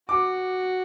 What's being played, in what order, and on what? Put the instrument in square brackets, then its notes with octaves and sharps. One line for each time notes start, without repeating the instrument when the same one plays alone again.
[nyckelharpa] F#4 [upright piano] D6